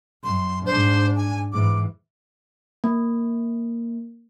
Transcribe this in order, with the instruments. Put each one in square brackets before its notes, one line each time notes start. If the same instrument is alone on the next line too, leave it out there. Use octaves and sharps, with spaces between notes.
[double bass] F#2 [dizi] C6
[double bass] G#2 D4 [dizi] C5
[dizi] G#5
[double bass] G#2 E3 [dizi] D6
[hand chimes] A#3